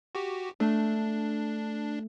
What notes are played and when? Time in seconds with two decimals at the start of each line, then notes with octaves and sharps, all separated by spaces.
0.15 F#4 G4
0.60 A3 D4